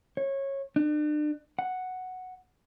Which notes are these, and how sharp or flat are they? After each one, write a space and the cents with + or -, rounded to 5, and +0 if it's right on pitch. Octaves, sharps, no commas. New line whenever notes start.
C#5 -20
D4 +40
F#5 +0